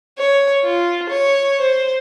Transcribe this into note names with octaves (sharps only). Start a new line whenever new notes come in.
C#5
F4
C#5
C5